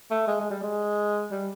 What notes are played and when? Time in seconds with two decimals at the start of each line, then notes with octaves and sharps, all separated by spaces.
0.10 A3
0.27 G#3
0.40 G#3
0.50 G3
0.63 G#3
1.32 G3